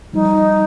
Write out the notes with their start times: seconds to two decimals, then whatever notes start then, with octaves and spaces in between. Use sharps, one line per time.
0.13 F3 G3 D#4